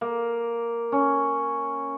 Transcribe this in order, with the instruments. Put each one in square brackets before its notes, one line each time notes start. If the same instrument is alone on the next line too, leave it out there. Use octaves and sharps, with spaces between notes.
[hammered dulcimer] A#3
C#4